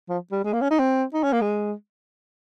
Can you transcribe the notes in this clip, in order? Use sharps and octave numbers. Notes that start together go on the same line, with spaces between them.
F3
G3
G#3
A#3
C#4
D#4
C4
D#4
C#4
A#3
G#3